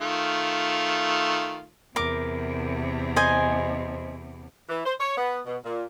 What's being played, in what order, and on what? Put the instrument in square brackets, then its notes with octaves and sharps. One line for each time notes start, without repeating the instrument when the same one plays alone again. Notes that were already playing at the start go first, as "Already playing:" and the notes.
[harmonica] D#3 A3 F4
[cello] E2 C3 [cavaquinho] A#4 D6
[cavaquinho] C5 D#5 G#5
[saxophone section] E3
C5
C#5
B3
B2
A#2